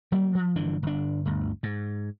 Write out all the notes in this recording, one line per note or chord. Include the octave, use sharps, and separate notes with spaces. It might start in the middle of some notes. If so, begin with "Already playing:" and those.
F#3 G3 A#3
F3
G1 E3 F3 D4
G1 D4
G1 D2
G#2